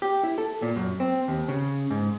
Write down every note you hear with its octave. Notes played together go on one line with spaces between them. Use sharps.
G4
E4
A4
A#2
F#2
C4
D#2
C#3
G#2